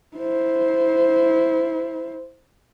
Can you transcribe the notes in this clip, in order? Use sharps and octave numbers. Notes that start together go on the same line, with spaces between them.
E4 C5